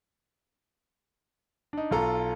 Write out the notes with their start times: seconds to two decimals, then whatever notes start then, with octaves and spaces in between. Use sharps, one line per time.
1.73 D4 D#4
1.91 B1 F4 A4 A#5